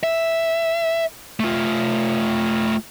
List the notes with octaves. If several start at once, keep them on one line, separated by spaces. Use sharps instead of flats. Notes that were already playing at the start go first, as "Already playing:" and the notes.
E5
A3 F4